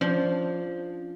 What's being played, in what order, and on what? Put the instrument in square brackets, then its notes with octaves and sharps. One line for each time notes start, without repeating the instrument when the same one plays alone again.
[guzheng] F3 [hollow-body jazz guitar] C#4 D4